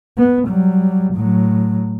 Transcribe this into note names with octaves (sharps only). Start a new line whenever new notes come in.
B3
F#3 G3
A2 F#3